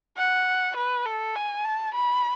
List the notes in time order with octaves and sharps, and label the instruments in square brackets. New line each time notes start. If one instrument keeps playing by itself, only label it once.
[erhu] F#5
B4
A4
G#5
A5
B5